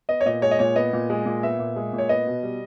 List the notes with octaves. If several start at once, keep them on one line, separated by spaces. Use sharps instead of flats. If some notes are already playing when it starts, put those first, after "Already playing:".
B3 D#5
C#5
A#2 D#5
G#3 C#5
D#5
A#2 C#5
B3 D#5
A#2
G#3
A#2
B3 E5
A#2
G#3
A#2
C#5
B3 D#5
B2
G3